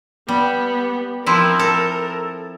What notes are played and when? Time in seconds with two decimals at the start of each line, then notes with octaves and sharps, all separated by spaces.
0.28 G3 B3
1.26 F3 C4 E4 A#4
1.59 A4